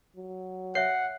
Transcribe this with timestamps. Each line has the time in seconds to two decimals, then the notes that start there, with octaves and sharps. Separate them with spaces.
0.16 F#3
0.75 C#5 E5 F#5 C7